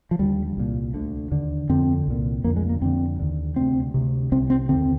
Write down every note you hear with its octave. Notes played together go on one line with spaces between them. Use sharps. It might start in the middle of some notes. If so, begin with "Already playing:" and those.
F3
D#2 D3 G3
C2 A#2
D2 D3
D#2 D3
F2 D3 C4
C2 A#2
F2 D3 A#3
G#3
A#3
F2 D3 C4
D#2 D3
D2 C3 C4
D2 C3
C2 C3 C4
C4
D#2 D3 C4